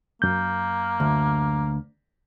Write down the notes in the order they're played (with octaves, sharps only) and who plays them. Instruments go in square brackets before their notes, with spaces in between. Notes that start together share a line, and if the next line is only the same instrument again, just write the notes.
[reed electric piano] F#2 G6 [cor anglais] A#3
[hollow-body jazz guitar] D2